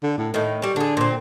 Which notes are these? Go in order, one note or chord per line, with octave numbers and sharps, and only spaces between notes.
D3
A2
A2 D#3 A3
G3 C#4
D3 D4 G#4
A#2 C4